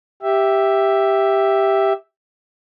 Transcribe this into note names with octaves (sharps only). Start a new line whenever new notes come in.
G4 E5